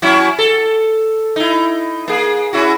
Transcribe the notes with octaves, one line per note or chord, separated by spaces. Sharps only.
F#3 C#4 E4
A4
D#4 E4
A#3 G#4
C#4 E4 F#4